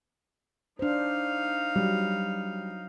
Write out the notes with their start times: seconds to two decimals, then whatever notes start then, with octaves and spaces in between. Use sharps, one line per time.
0.79 D4 D#4 C5 F5
1.76 F#3 G3